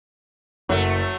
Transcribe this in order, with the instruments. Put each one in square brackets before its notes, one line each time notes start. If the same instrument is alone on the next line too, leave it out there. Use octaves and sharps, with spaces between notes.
[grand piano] F#1 [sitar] F#3 A3